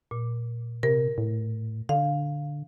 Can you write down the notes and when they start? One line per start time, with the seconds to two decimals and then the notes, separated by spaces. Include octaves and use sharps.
0.11 A#2
0.83 C3 A#4
1.18 A2
1.89 D3 F5